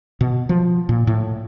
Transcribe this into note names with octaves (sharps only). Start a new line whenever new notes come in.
B2
F3
A#2
A2